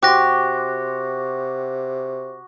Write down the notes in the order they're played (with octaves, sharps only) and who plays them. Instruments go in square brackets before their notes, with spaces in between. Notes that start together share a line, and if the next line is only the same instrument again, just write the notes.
[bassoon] C3 [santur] F#4 C6 [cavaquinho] G4 [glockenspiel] D6 F#6 A#6